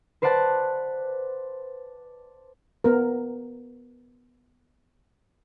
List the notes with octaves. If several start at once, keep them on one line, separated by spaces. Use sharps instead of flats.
B4 C5 D5 F#5 A5 F#6
B3 A#4